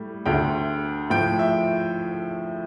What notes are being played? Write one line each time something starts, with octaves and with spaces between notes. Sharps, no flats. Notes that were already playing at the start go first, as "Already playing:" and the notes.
Already playing: A2 G3
D2 D3 A3 G5
A2 F3 A3 G5
E5